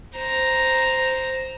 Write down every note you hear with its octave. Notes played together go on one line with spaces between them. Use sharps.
C5 A#5